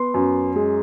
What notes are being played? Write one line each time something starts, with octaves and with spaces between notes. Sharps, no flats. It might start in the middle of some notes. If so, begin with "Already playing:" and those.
Already playing: B3 C6
F#2
G#3